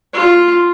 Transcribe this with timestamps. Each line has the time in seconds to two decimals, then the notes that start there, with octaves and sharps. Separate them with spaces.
0.13 F4